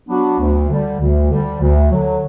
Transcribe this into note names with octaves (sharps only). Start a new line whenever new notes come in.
F#3 B3 D4 F#4
D2
D3 G3
D2
D3 G3
D2
D3 F#3